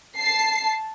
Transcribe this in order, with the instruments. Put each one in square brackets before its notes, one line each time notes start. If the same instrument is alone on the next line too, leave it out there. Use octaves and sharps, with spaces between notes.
[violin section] A5 C7